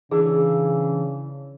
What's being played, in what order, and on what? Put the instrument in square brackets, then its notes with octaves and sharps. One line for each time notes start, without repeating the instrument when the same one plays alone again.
[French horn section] C#3 [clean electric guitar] E3 D4 [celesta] G#4